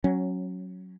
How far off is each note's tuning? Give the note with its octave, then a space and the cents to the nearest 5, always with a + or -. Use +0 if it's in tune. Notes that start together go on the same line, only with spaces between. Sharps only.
F#3 +0 C#4 -15